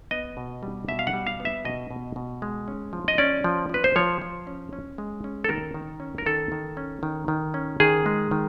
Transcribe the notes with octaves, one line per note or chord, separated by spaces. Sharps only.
B3 D#5
B2
G3
B2 E5
F5
F#5
G3
F5
B3
E5
B2 D#5
B2
B2
G#3
C#4
F3
D#5
C#4 D5
F3
F3 B4
C5
F3 C#5
F3
C#4
C#4
G#3
C#4
A4
D#3 A#4
D#3
C#4
A#4
D#3 A4
D#3
C#4
D#3
D#3
C#4
D#3 G#4
G#3
D#3